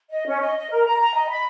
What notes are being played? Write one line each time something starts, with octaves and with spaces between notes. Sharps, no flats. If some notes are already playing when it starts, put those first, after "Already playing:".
D#5
C#4
D#5
D#5
A#4
A#5
A#5
D#5
B5